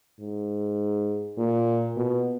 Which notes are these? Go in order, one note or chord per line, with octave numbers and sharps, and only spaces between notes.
G#2
A#2
B2